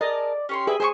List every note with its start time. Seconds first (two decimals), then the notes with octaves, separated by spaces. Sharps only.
0.01 G#4 A#4 D5 D#5 A5
0.49 C#4 G4 C#5 C6
0.67 G#4 B4 D5 E5
0.80 G#4 C5 E5 G#5 C#6